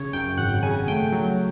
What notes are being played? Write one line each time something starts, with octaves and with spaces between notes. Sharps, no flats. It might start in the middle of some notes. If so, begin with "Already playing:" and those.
Already playing: C#3 C#5
F#2 G5
G#1 F#5
C#3 G#5
A3 G5
F#3